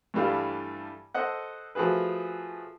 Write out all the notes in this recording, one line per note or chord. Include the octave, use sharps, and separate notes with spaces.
G2 E3 G3 A3 F5
A4 C5 D#5 F#5
F3 A3 F#4 G#4 B4